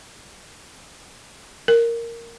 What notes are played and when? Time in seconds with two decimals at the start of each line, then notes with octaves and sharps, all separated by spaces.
1.68 A#4